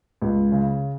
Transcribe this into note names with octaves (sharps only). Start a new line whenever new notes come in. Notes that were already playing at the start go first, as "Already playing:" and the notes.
C#2
C#3